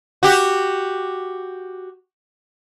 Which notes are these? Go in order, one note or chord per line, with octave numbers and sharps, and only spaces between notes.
F#4 G4